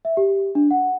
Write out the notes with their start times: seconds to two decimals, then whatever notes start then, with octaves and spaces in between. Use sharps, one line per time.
0.05 E5
0.17 G4
0.55 D4
0.71 F#5